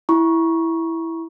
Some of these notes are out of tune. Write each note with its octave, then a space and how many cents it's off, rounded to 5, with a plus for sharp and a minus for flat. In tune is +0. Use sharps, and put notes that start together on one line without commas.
E4 +0 A#5 +35 C#6 +0